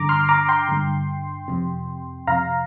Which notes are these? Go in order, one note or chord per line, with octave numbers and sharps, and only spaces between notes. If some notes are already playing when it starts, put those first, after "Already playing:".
Already playing: G2 D3 A#5 D6
C6 F6
A#5 D6
G5 C6
G2 D3
F2 C3
F2 C3 F5 A#5